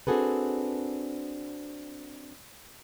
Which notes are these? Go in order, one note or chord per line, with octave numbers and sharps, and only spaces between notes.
C4 D4 F#4 G#4 A4 B4